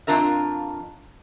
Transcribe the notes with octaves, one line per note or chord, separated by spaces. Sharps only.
F2 D4 F4 A#4 E5